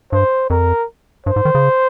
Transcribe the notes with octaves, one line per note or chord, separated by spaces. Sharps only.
G2 C5
F2 A#4
G2 C5
G#2
D#3
C#3